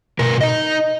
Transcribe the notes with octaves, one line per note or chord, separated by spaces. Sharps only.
B2 A#4
D#4 D#5